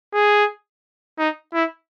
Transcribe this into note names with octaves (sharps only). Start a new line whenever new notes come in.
G#4
D#4
E4